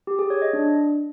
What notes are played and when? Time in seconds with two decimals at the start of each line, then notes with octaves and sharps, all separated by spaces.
0.07 G4
0.19 G#4
0.30 C#5
0.42 D#5
0.53 D4